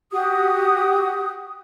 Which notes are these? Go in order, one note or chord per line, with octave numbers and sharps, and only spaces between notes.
F#4 G4 D#6